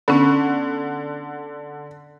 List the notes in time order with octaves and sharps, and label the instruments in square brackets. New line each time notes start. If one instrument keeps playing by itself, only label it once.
[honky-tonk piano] D3 [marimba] B3 C#4